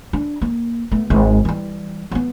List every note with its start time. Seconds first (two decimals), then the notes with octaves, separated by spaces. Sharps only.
0.13 D4
0.42 A#3
0.92 A3 B3
1.10 G#1 G#2
1.45 E3 G3
2.11 F#3 B3